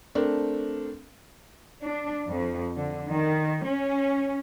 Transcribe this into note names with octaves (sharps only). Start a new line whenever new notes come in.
A3 C4 D4 A#4
D4
F2
D3
D#3
C#4